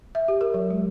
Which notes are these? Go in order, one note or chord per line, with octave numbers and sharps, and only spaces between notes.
E5
G4
A#4
F#3
G#3